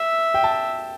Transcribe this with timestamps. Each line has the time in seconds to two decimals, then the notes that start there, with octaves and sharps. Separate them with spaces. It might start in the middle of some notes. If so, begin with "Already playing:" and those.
Already playing: E5
0.34 G5
0.44 A5